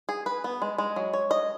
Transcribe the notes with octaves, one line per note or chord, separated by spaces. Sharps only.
G#4
B4
B3
G#3
G#3
F#3
C#5
D#5